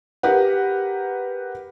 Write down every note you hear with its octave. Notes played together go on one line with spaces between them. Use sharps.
G4 A#4 B4 F#5